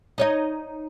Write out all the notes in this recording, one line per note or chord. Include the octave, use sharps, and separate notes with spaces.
D#4 C#5 D#5